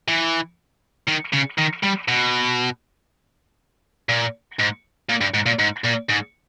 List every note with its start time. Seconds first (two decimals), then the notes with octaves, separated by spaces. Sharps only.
0.08 E3
1.08 D#3
1.33 C#3
1.58 D#3
1.83 G3
2.08 B2
4.09 A#2
4.59 G#2
5.09 A#2
5.21 G2
5.34 G#2
5.46 A#2
5.59 G#2
5.84 A#2
6.09 G#2